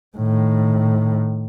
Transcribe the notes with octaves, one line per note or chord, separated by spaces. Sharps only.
A2 D#3